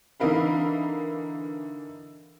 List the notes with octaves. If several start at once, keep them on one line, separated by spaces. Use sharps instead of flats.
D3 E3 D#4 A#4 F5 B5